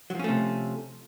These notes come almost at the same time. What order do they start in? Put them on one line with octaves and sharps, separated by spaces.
F#3 F3 C#4 A3 C3